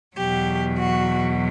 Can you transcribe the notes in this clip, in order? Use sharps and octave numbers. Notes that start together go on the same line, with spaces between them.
E2 B2 F#3 G4
F#4